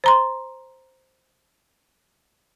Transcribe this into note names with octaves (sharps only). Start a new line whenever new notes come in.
C5 A#5 C6